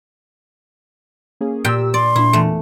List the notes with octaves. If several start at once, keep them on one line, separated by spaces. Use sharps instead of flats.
A#3 C#4 G#4
A#2 G4 G5 E6
D5 C6
A#2 D4 E4
E2 A3